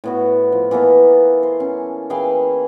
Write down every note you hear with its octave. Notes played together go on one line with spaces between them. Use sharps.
A2 B3 F#4
F3
E3 A#3 B3 A4
C5
C#4
E3 G#4 F5 G5